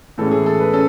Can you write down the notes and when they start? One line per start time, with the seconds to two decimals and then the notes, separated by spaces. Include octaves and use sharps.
0.18 A2 E3 G#3 C#4 A4
0.31 G#4
0.46 A4
0.60 B4
0.73 C#4 A4